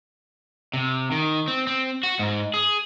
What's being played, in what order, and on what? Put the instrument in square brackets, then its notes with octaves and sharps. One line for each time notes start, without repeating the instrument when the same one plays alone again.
[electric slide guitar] C3
D#3
C4
C4
F#4
G#2
G#4